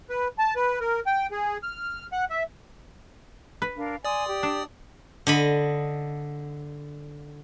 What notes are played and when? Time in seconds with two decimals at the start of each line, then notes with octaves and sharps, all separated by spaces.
0.10 B4
0.39 A5
0.56 B4
0.80 A#4
1.06 G5
1.31 G#4
1.63 F6
2.12 F#5
2.30 E5
3.62 B4
3.77 D4 A#4 F5
4.05 D5 G#5 C6 D6 D#6
4.28 G4
4.43 D4
5.27 D3 D#5 B5